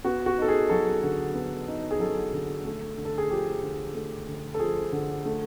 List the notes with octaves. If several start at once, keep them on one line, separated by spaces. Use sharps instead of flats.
B3 F#4
F#4
D#4 A4
G#4
F#3 A4
D3
B3
D#4
G#4
F#3 A4
D3
A3
D3
A4
G#4
F3 G4
D3
A3
D3
A4
F3 G#4
D3
A3